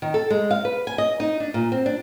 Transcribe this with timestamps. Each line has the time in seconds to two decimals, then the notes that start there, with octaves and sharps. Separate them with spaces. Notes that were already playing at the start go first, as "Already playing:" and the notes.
0.02 D#3
0.14 A4
0.30 G#3
0.51 F5
0.65 B4
0.87 G#5
0.98 D#5
1.20 D#4
1.40 D4
1.54 A#2
1.72 C4
1.86 D4